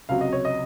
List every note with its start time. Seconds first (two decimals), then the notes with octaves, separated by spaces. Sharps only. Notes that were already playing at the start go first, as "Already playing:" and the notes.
0.09 C#2 C3 F#3 F5
0.21 D#5
0.33 C#5
0.45 D#5